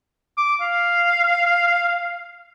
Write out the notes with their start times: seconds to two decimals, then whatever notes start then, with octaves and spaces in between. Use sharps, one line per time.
0.38 D6
0.61 F5